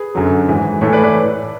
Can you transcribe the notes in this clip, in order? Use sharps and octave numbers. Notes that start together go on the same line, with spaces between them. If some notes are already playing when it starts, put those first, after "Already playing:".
Already playing: G#4 B4
F#2 D3 F#3
G#2 E3
A2 E3 A4 C#5
B4 D5
B4 D5